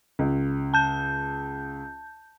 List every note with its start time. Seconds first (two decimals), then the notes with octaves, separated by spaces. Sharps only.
0.19 C#2
0.74 A5 G6